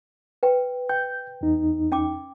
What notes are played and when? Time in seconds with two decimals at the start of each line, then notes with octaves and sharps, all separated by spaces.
0.43 B4 G5
0.89 G5 G6
1.41 E2 D#4
1.92 C#4 G5 D6